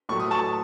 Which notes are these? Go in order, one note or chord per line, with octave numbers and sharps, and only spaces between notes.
A2 F#3 A3 C#6
D#6
A5 C#6